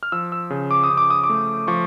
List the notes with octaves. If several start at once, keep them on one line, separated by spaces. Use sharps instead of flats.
F6
F3 E6
E6
C#3
D6
D#6
C#3
D6
D#6
D6
A3
F3 C#6